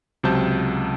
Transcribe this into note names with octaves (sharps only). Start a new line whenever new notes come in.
C#2 C3 F#3 C5 A5 G6